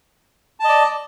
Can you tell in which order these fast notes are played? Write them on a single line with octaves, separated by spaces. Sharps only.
A5 D#5 D5